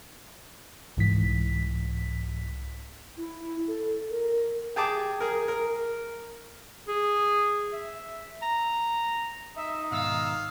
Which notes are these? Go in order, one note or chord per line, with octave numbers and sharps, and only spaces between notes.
C2 G#2 E3 B6
E4
A4
A#4
G4 G#4 A5 D6
G#4 A#4
A#4
G#4
E5
A#5
D#4 E5
G#2 B2 D#3 F5 E6